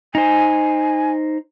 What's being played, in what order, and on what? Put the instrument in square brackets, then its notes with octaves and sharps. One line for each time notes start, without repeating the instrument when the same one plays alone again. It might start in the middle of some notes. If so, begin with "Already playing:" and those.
[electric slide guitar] D#4 C5 [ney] G#5